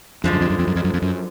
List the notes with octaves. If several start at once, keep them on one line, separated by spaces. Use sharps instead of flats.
F2 D3 F3 G#3
F#2
F2
F#2
F2
F#2
F2
F#2
F2
F#2